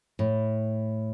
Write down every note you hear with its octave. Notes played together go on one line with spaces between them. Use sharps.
A2